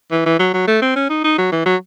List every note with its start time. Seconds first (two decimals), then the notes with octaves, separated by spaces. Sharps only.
0.11 E3
0.26 E3
0.39 F#3
0.54 F#3
0.68 A3
0.82 C4
0.96 C#4
1.10 D#4
1.24 D#4
1.38 F#3
1.52 E3
1.66 F#3